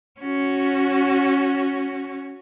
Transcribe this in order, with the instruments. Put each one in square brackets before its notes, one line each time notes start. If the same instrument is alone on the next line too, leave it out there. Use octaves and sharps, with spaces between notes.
[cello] C#4 F#4